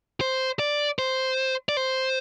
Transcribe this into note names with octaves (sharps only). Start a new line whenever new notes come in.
C5
D5
C5
D5
C5